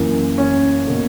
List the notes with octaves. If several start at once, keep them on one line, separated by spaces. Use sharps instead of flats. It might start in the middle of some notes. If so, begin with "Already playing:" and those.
Already playing: F#2 E3 A#3
C#4
B2 A#3